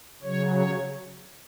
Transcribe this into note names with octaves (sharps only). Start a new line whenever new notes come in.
C#3 F#3 C#5
C#5